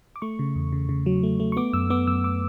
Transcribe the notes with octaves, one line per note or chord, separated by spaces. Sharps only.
D6
A3 C#6
C#3
E2
C#3
C#3
F#3
A3
A3
C#6
B3 D6
F#2 E6
B3 D6
F#2 E6
D6